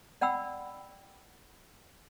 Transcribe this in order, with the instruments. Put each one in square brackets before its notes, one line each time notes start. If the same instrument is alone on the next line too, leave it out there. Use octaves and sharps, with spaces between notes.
[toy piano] D5 F#5 G5 B5 E6